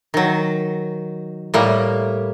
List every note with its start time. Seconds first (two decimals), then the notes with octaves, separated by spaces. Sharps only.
0.14 D#3 F#3
1.54 A2 G3 A#3